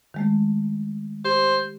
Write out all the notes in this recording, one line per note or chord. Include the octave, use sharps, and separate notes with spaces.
D#3 G#3 A3
G4 C5